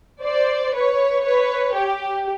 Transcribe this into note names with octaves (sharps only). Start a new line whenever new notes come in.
C5 D5
B4 C#5
B4 C#5
G4